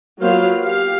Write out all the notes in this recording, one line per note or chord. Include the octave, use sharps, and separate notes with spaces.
F#3 A#3 B3 F4 C5 F5
G4 F5